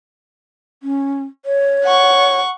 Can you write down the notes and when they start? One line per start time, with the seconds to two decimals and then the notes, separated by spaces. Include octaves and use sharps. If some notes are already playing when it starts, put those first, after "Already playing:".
0.83 C#4
1.45 C#5
1.84 F#5 C#6